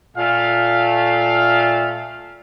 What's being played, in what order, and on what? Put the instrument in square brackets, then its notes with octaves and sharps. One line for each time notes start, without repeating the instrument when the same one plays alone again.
[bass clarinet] A#2 [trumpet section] A3 F5